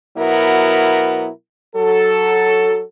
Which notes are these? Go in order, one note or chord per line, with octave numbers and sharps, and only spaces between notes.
B2 F#3 B3 E4 A#4
F#3 A4